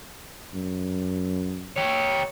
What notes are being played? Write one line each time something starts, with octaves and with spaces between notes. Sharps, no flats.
F#2
G4 C#5